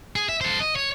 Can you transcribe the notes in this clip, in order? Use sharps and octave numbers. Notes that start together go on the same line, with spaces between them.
G#4
E5
A4 C5
D#5
C#5